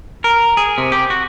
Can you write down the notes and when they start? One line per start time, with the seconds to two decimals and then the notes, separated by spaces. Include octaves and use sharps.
0.24 A#4
0.57 G#4
0.78 C3
0.92 G4
1.10 F#4